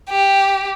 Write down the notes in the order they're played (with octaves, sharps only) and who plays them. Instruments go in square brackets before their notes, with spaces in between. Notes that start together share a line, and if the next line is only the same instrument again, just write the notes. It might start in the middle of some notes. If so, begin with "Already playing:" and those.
[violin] G4